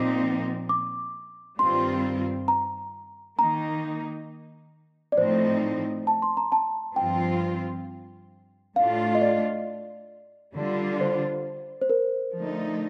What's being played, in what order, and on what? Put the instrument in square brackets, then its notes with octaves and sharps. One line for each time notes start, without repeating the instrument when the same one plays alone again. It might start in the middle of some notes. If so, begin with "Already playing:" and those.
Already playing: [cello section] A#2 F3 C4 D#4 [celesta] D6
[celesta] D6
[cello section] G2 D#3 G3 C4 F4 [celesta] C6
[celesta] A#5
[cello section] D#3 A#3 D#4 [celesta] A#5
[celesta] D5
[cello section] A2 F3 C4 D#4 [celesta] C5
[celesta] A5
C6
A#5
A5
[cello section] G2 F3 C4 F4 [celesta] G5
[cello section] A2 A3 D4 F4 [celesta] F5
[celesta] D#5
D5
[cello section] D3 G3 D4 F4
[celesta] C5
C5
A#4
[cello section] D3 F3 A3 D#4